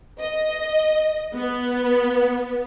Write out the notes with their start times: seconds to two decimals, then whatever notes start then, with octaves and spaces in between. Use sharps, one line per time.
0.20 D#5
1.34 B3